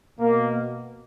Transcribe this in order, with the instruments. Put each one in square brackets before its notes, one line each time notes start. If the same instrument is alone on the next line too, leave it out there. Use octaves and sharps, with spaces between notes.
[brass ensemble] B2 A#3